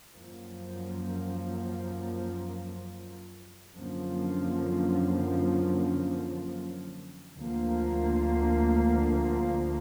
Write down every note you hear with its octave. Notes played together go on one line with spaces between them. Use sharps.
F#2 F3 A#3
F#2 D3 F3 A#3
D2 D3 F3 A#3